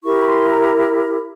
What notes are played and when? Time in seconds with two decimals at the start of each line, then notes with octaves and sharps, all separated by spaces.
0.03 E4 G4 A#4 C#6
0.19 B5
0.26 C6
0.49 A#5